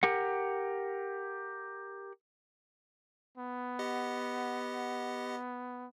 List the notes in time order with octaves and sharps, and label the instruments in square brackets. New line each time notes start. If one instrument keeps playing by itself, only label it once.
[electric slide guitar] G4 A#4 F#5
[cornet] B3
[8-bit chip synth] G4 D#5 F#5